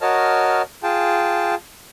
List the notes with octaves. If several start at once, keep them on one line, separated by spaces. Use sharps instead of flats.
F#4 A#4 C#5 D#5 A5 F6
F4 G#4 G5 A5